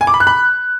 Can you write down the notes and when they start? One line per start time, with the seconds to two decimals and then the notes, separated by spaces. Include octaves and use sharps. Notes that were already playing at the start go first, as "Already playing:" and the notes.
0.01 G#5
0.07 D6
0.14 B5
0.20 F#6
0.27 B5